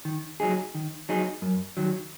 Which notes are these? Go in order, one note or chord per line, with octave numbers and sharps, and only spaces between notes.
D#3
F#3 D#4 G#4
D#3
F#3 D#4 G#4
F#2
D#3 F#3